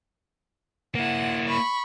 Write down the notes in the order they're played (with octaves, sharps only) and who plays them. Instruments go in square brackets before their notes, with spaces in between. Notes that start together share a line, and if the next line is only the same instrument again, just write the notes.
[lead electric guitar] A#3 E4 [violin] F#5
[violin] B5 C#6